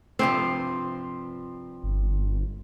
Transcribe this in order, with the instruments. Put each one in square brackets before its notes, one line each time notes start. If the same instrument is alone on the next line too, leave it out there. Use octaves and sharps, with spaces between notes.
[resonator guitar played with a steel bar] G2 C3 F3 [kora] C4
[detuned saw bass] G1